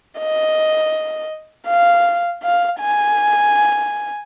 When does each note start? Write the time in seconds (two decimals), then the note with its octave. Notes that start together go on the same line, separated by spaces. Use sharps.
0.19 D#5
1.68 F5
2.43 F5
2.80 G#5